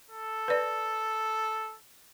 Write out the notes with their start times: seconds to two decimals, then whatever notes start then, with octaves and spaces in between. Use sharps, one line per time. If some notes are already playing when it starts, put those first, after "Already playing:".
0.10 A4
0.48 B4 D5